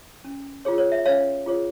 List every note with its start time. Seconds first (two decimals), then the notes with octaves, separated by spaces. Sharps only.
0.25 C#4
0.65 F4 G#4 C#5
0.78 C#5
0.92 E5
1.06 C#4 C#5 F5
1.46 F4 G#4 C#5